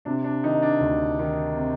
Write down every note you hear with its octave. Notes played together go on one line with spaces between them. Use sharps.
C3 D4
D4
D#3 D#4
D4
D2
D#3
C3